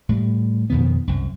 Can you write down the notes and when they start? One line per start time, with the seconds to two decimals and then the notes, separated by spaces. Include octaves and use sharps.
0.09 A2 G3
0.70 F2 B2 D#3 B3
1.07 C2 F#2